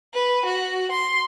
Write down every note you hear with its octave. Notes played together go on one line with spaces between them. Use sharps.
B4
F#4
C6